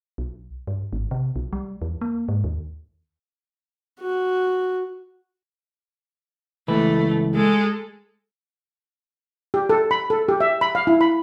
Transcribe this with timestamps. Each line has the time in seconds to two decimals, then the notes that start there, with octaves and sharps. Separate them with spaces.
0.18 B1
0.67 G2
0.93 G#1
1.11 C3
1.36 B1
1.53 G3
1.82 E2
2.01 A#3
2.29 G#2
2.44 D#2
4.00 F#4
6.68 C#2 E3 A3 B4
7.34 G#3 A4
9.54 G4
9.70 A4
9.91 B5
10.10 A4
10.29 G4
10.40 E5
10.61 B5
10.75 F5
10.87 E4
11.01 B5